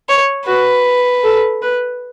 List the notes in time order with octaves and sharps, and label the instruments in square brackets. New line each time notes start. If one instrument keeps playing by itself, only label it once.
[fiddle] C#5
[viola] F#4 [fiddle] B4
[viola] A4
B4